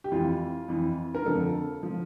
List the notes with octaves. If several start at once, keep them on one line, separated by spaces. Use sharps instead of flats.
G4
F2 E3 F4
F2 E3
A#4
F2 D3 F3 A4
D3 F3